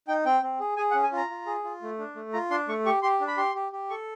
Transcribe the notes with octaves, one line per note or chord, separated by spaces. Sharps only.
D#4 G5
C4 G5
C4
G#4
G#4 G#5
F#5
C#4
G#5
F4 A#5
F4
G#4
F4
A3
D4
A3
F4 A#5
D4 C6
A3 C#6
G4 C#6
G4 C6
D4
B5
G4 C6
G4
G4
A4 C#6